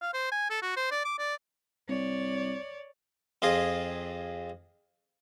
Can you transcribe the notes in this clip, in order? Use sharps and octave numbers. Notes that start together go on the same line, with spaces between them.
F5
C5
G#5
A4
F#4
C5
D5
D6
D5
C2 C#5 D5
F2 F4 G#4 D#5